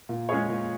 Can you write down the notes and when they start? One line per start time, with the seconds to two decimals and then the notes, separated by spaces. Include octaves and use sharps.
0.09 A#2
0.29 G#3 C#4 G#4 C#5
0.49 A#2